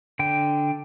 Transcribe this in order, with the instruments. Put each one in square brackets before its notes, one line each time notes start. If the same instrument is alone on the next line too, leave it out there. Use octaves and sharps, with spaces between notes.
[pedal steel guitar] D3 G5